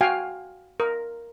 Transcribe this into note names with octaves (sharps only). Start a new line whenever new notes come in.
F#4 F5 G5 G#5
A#4